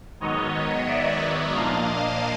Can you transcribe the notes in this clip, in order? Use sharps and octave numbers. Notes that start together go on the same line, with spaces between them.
G#2 D#3 F#3 B3 C#5 D#5
D5 E5
A#2 F3 A#3 D4 D#5 F5